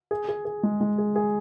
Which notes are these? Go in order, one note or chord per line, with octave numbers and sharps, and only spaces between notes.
G#4
G#4
G#4
G#3
G#3
G#4
G#4